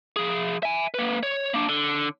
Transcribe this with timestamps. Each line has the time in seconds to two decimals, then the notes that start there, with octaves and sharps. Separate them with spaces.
0.16 F3 G#4
0.63 E5 G#5
0.94 A#3 B4
1.23 C#5
1.54 A#3 D4
1.69 D3